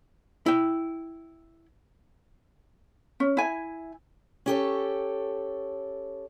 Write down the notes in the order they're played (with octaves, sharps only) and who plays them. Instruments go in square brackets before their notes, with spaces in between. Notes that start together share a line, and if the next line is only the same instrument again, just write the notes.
[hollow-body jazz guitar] E4 G5
[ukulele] C#4
E4 G#5
[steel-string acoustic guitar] C#4 G4 A4 C#5